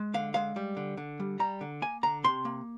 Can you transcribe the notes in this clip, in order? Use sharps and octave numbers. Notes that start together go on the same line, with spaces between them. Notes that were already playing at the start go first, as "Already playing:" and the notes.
Already playing: G#3
D3 F5
G#3 F5
G3
D3
D3
G3
G3 A#5
D3
A#3 G#5
D3 A#5
C3 C6
A#3